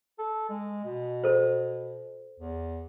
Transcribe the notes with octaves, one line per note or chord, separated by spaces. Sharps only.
A4
G#3
B2
A4 C5
E2